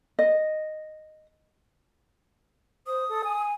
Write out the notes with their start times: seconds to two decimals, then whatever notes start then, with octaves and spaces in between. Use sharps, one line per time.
0.19 D#5
2.87 C5 D#6
3.09 A4
3.24 G#5